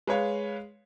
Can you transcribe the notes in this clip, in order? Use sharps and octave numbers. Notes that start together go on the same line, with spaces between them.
G#3 B4 C#5 F5